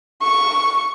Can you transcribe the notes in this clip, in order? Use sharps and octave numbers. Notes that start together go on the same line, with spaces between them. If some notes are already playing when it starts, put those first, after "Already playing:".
C#6